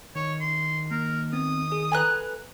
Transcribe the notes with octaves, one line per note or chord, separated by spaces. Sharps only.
D#3 C#5
C6
A#3 A#4
B3 C4 D#6
G#4
A4 B4 G#5 A#5 F#6